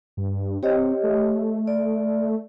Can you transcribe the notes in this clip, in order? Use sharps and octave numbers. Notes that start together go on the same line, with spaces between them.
G2
C4 G4 C#5 D#5
A3
D5